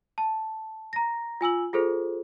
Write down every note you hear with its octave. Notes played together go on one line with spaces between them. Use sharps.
A5
A#5 A#6
F4 G#5 E6 F#7
F4 G#4 A4 C5